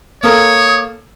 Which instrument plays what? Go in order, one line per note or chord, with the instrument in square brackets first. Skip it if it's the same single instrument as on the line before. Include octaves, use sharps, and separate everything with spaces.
[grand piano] A#3 A4 A#4 [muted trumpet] C#5 [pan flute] D#6